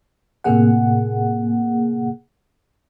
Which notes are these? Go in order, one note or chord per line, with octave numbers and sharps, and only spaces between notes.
A2 C3 A#3 G#4 F#5